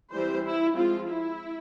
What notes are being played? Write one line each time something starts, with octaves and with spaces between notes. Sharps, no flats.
E3 G3 C4 C5
E4
F3 G#3 C4 F4
E4